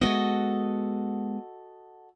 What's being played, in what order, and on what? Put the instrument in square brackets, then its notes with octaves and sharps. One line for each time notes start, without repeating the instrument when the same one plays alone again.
[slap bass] G#3 A3 B3 [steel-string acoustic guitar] F#4 A4 D#5